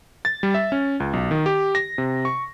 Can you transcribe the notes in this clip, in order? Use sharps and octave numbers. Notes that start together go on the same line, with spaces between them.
A6
G3
E5
C#4
C#2
B1
D#3
G4
A#6
C3
C#6